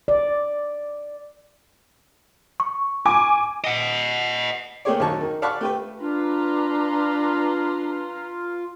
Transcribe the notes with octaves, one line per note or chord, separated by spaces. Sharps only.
D5
C#6
G#5 D6
D#5 F#5
A3 A#3 G4 G#4 C#5 D5
D#2 F#3 A5 C#6
D#3
D5 F5 F#5 A5 B5 C#6
A3 G4 B4
D4 F4 B4 A#5 C6